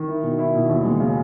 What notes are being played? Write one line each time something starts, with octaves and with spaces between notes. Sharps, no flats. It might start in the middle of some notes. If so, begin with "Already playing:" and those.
Already playing: D#3
E4
B2
E4
B2
D#2
G#3
C#3